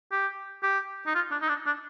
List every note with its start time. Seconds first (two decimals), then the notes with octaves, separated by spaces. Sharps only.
0.12 G4
0.63 G4
1.06 D#4
1.15 F4
1.31 D4
1.42 D#4
1.49 D4
1.66 D4